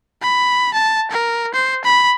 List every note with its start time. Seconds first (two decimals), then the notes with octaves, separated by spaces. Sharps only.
0.21 B5
0.73 A5
1.11 A#4
1.54 C5
1.84 B5